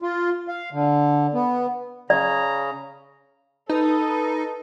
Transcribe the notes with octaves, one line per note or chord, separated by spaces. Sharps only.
F4
F5
D3
B3
C#3 D5 A#5
D#4 A4 B4